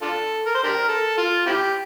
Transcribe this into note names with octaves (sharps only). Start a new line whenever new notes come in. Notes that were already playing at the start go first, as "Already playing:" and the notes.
D4 F4 A4
A#4
C5
D4 G4 A#4
A4
F4
C4 E4 G4